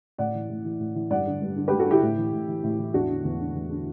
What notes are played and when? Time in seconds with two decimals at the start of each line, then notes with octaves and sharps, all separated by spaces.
0.18 A2 D5 F#5
0.34 E3
0.49 A2
0.65 E3
0.79 A2
0.95 E3
1.11 G2 D5 F#5
1.26 D3
1.42 G2
1.56 D3
1.68 G2 G4 B4
1.79 F#4 A4
1.87 D3 E4 G4
2.02 A2
2.17 E3
2.33 A2
2.48 E3
2.63 A2
2.79 E3
2.94 E2 D4 F#4
3.09 D3
3.25 E2
3.40 D3
3.55 E2
3.70 D3